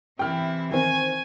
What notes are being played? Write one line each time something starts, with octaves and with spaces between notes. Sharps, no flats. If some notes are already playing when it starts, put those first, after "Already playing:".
C3 E3 E4 G5 F6
D#3 C4 G#5